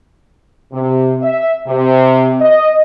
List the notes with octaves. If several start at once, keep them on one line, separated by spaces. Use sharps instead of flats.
C3
E5
C3
D#5